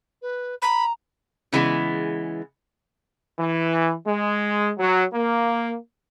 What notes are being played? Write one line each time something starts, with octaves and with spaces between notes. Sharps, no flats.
B4
A#5 B5
C#3 E3 G#3 B3
E3
G#3
F#3
A#3